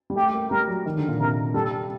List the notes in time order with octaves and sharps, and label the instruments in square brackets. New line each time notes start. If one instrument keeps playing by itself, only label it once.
[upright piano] G3
[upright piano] A3 [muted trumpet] G4
[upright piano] A#3
[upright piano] G3 [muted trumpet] A#4
[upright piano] F#3
D#3
D3
A#2
[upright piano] C3 [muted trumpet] A#4
[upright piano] G3 [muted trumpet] A4